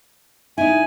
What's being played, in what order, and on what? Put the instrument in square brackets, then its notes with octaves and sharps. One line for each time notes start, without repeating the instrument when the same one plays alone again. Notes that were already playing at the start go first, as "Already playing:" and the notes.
[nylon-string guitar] D#4 E4 [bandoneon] G#5